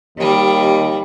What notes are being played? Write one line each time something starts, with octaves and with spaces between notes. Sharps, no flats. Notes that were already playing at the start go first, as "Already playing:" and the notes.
D#2 D#3 G3